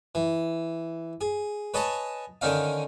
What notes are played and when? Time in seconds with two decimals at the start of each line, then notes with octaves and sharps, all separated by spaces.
0.15 E3
1.21 G#4
1.74 B4 C#5 D#5 G#5 A5
2.41 D3 D#3 C#4 D#4 F5